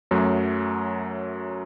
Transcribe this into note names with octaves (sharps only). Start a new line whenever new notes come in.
F#2 F#3 A3